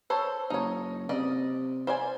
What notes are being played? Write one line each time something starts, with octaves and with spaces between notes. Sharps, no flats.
A4 C5 C#5
F#1 D#4 C#5
C3 D5 D#5
C5 D5 G#5